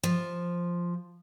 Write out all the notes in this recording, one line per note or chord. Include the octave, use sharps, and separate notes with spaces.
F3